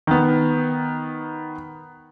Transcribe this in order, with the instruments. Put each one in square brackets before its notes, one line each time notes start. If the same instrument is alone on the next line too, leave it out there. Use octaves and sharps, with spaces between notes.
[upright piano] D#3 B3